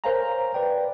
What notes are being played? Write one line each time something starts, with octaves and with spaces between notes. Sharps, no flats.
A#4 C5 C#5 F5 G#5 A#5
B4 D5 G5